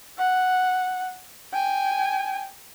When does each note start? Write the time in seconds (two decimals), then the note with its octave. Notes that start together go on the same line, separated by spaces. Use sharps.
0.18 F#5
1.53 G5 G#5